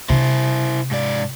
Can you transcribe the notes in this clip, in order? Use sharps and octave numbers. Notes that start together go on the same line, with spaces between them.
C3 D4 E4 C5
G#2 D5